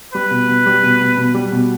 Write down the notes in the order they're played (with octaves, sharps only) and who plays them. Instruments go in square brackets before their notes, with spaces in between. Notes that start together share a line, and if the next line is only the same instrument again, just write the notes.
[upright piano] G3 [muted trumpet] B4
[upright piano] B2
B2
G3
B2
B2
B2
G3
B2